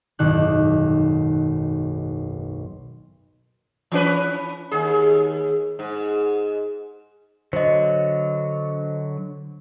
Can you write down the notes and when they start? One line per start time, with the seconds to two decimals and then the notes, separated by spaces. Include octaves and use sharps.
0.19 F#1 B1 G#2 D#3 F#6
3.92 E3 C#4 B4
4.71 D#2 G#4
5.79 G#2
7.53 D3 F#3 C5 D#5